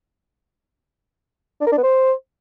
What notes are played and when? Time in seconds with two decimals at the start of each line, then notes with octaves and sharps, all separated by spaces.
1.61 D4
1.67 A#4
1.72 D4
1.78 B3
1.83 C5